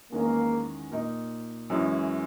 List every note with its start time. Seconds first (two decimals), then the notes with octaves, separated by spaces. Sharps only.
0.12 E2 D#3 G#3 A#3 C#4
0.91 A#2 A#3 D#4
1.70 F#2 E3 G#3 C#4 E4